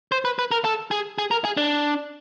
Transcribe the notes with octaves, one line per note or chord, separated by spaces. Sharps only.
C5
B4
B4
A#4
A4
G#4
G#4
A#4
G#4
D4